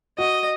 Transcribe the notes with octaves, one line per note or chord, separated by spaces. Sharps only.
F#4 D#5